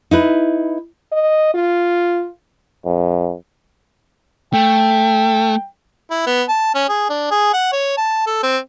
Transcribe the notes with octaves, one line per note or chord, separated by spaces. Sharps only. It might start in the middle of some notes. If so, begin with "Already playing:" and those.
D#4 E4 B4
D#5
F4
F2
A3 G5
E4
B3
A5
C#4
G#4
D4
G#4
F#5
C#5
A5
A4
C4